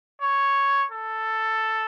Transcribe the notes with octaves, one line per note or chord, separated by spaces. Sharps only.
C#5
A4